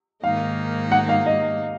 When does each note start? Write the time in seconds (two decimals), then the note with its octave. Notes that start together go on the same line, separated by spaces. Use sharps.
0.23 G#2 D#3 A#3 D#4 F5
0.92 F#5
1.09 F5
1.26 D#5